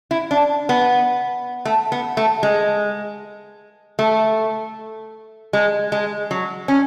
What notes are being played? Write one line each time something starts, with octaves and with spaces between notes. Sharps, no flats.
E4
D4
B3
A3
B3
A3
G#3
A3
G#3
G#3
F#3
C#4